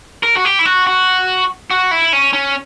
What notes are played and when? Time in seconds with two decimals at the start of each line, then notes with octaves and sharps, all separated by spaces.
0.23 A#4
0.36 F#4
0.45 G4
0.59 E4
0.65 F#4
0.87 F#4
1.71 F#4
1.91 E4
2.13 C#4
2.33 C#4